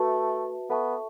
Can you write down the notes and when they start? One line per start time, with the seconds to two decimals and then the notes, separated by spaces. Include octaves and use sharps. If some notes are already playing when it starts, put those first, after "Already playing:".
Already playing: A3 F#4 B4 E5 A5
0.70 B3 A4 E5 A5 C#6